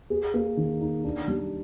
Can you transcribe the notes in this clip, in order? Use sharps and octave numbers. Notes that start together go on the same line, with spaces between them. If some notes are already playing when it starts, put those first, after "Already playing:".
G#4
A#3
D#3
D#4
D4
G3